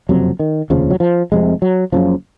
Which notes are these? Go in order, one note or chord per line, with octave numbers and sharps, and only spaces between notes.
F#1 F2 C3 F#3
D#3
F1 D#2 C#3 F3
F#3
F3
F1 F2 C3 G#3
F#3
F#1 F#2 C#3 F3